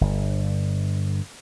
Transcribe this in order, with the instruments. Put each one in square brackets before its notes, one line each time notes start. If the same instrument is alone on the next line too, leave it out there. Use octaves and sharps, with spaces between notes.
[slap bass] G1